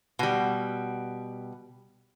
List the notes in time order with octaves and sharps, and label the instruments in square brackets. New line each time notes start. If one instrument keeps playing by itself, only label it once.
[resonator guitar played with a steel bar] B2 G3